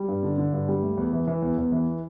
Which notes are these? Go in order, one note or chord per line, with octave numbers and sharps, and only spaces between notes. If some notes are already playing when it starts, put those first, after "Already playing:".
Already playing: G3
G2
D3
D3
G2
G3
A3
E2
E3
E3
E2
E2
E3